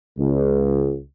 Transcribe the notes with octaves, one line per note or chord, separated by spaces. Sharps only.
C#2